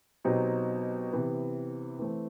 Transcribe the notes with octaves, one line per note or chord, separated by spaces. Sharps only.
B2 F#3 C4 D#4 G4
C3 E3 B3
E3 A3 C4